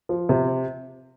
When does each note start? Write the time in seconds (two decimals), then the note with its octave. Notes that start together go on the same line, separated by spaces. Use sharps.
0.09 F3
0.29 C3